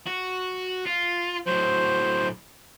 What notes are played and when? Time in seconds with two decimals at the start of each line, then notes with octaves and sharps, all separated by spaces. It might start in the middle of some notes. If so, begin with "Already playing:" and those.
0.07 F#4
0.86 F4
1.47 A2 F#3 C5